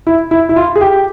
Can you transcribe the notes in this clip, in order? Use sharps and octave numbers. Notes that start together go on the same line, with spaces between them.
E4
E4
E4
F4
G#4
G4